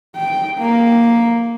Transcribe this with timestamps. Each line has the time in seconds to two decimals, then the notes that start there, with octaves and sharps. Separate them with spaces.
0.16 G5
0.58 A#3